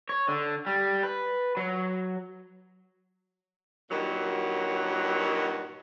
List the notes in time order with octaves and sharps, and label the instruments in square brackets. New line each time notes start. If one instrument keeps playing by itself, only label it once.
[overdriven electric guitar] C#5
D3
G3
B4
F#3
[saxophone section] G2 A#2 D#3 F#3